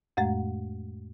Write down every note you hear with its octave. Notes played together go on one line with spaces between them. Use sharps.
F2 A2 G#3 A3